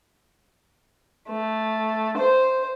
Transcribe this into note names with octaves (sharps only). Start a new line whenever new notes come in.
A3
C5